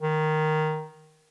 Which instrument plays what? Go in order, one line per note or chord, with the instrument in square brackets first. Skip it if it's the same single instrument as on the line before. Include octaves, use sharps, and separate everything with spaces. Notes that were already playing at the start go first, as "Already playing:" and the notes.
[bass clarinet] D#3